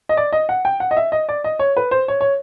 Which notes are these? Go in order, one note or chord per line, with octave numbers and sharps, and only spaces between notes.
D#5
D5
D#5
F#5
G5
F#5
D#5
E5
D#5
D5
D#5
C#5
B4
C5
C#5
C#5